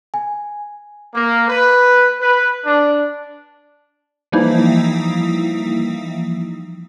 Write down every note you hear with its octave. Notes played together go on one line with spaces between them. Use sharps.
G#5
A#3
B4
B4
D4
E3 F3 G3 A#3 D#4 E4